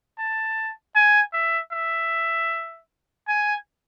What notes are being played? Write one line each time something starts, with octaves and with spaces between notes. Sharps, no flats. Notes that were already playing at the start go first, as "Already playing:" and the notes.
A5
G#5
E5
E5
G#5